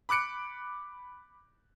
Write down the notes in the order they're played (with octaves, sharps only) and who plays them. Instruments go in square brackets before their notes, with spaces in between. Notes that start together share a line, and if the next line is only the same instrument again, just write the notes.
[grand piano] B5 D6 F#6 C#7 D7